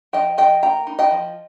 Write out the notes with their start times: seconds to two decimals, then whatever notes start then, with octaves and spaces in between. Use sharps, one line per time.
0.13 F3 D#5 G5
0.37 F3 D#5 G5
0.62 A#3 G5 A#5
0.87 D#4
0.99 D#5 G5
1.11 F3